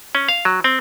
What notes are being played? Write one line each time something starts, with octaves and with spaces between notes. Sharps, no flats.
C#4
F5
F#3
C4